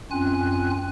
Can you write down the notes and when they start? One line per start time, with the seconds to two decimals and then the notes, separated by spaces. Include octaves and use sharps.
0.11 F#2 C4 C#4 F4 G#5 F#6